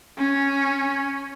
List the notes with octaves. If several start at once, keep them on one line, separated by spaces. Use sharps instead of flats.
C#4